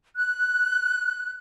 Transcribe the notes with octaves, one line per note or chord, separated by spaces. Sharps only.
F#6